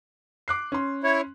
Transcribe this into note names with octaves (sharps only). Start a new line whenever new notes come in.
D6 F#6 C7
C#4 C6
E4 C#5